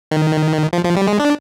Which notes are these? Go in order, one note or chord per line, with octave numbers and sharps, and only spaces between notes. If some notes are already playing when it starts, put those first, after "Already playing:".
D#3
F3
F3
G3
G#3
D4